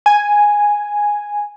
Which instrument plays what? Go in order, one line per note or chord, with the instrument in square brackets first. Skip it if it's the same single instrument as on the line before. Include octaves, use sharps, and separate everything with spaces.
[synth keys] G#5